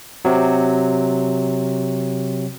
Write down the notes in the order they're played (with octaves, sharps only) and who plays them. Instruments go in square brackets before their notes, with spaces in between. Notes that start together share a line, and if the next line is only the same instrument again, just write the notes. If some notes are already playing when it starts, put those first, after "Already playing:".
[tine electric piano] C3 F#3